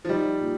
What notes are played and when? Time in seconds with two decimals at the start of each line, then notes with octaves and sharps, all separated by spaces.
0.05 F3
0.09 G3 D#4
0.40 A#2